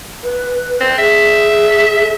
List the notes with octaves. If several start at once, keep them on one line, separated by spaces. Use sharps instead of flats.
B4
C4
G#4 E5